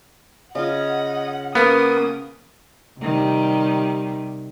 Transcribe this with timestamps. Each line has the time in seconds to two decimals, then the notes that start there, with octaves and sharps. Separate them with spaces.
0.55 C#3 F4 D#5 F#5
1.55 A#3 B3 C#4 D#6
3.00 C3 D#3 G3